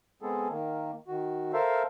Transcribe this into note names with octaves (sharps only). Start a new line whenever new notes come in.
G#3 B3 C4 G#4 A4
D#3 A#3
D#3 F#4
A4 A#4 C5 E5 F5